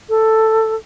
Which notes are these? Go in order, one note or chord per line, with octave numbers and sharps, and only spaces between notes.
A4